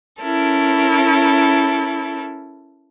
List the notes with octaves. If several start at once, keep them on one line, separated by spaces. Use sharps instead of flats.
C#4 E4 A4 A#4